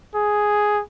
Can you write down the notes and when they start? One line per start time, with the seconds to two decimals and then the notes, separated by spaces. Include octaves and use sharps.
0.15 G#4